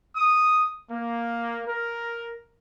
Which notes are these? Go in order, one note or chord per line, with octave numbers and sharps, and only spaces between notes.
D#6
A#3
A#4